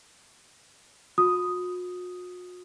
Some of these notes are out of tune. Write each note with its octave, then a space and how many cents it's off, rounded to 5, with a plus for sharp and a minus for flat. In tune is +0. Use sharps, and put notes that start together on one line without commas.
F#4 -45 D#6 +0